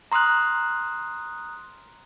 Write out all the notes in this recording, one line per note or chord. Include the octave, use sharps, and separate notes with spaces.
A#5 C6 D#6 F6 F#6